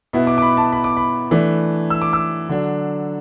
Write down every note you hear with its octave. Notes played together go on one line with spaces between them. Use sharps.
B2 B3 E4
D6
D6
B5
A5
B5
D6
B5
E3 A3 D4
E6
D6
E6
D3 F#3 D4